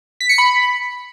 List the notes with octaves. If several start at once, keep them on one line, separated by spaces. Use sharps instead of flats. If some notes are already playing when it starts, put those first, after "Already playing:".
B6
C#7
B5